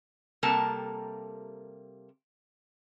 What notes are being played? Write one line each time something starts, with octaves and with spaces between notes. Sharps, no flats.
C3 G3 A#3 A4 A#4 A5